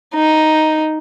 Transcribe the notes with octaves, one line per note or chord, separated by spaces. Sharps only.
D#4